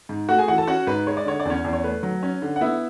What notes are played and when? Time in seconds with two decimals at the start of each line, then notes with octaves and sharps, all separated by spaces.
0.09 G#2
0.29 A3 F#4 F#5
0.38 G#4 G#5
0.48 E3 F#4 F#5
0.58 A4 A5
0.67 C#4 F#4 F#5
0.87 G#2 B4
1.07 G#3 C#5
1.17 D5
1.26 D3 C#5
1.40 D5
1.45 E2 C#4 C#5
1.64 E2
1.73 C#5
1.84 A3 B4
2.03 F#3
2.23 C#4
2.42 D3
2.56 F#5
2.61 B3 E4 E5